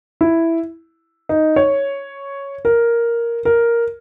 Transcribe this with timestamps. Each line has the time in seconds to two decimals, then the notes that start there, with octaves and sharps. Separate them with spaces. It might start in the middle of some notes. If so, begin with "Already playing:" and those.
0.21 E4
1.29 D#4
1.56 C#5
2.65 A#4
3.45 A#4